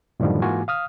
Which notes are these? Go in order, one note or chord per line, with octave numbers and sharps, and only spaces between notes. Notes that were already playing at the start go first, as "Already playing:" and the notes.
F#2 A2 D3 D#3 F3 G3
G#2 E3 A#3 F4 F#4 G#5
F5 D#6 F6